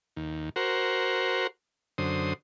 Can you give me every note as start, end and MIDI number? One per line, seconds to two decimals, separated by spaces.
0.16 0.49 39
0.56 1.47 66
0.56 1.47 70
0.56 1.47 72
1.98 2.33 42
1.98 2.33 50
1.98 2.33 72
1.98 2.33 87